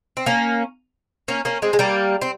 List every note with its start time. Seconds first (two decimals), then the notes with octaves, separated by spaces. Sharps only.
0.17 C4
0.26 A#3 C#4
1.28 A#3 C#4
1.45 A#3 C#4
1.62 G#3 C4
1.73 G#3
1.79 G3 A#3
2.21 C4